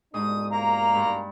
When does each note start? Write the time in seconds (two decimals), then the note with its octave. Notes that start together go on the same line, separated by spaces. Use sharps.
0.14 C2 G#2 B2 D4 D#6
0.51 A#3 A#5
0.95 G2